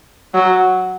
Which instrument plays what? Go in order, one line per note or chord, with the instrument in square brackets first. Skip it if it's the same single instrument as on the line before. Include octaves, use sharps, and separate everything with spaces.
[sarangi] F#3